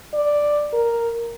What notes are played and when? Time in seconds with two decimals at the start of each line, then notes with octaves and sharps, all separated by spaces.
0.14 D5
0.73 A#4